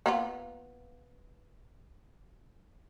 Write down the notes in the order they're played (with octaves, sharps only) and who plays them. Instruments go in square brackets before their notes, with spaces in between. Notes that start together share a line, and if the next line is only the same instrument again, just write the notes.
[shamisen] A#3 B3 F4